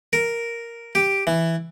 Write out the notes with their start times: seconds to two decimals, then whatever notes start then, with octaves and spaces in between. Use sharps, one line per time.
0.13 A#4
0.95 G4
1.27 E3